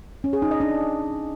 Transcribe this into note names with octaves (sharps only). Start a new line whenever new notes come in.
C#4
G#4
D#4
D#5
D4